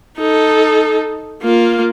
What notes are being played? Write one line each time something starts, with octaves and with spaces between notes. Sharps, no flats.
D#4 A4
A#3 F4